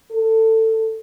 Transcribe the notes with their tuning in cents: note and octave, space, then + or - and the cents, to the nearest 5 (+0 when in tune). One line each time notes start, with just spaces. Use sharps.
A4 +20